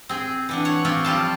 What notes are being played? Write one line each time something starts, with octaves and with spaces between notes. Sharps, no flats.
C4 G#4
E3 D4 F#5
C#5 F#5
C4 F4 G4 C#5
F3 G3 F4 A5